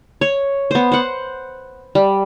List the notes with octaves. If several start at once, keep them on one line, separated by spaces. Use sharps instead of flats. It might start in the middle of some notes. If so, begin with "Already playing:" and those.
C#5
B3 C5
C5 F#5
G3